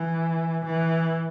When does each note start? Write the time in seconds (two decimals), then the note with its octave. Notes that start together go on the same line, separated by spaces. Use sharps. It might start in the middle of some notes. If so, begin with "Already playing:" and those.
Already playing: E3
0.65 E3